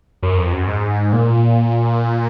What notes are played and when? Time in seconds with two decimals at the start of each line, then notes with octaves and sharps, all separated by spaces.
0.23 F#2
0.37 F2
0.53 F#2
0.67 G#2
1.13 A#2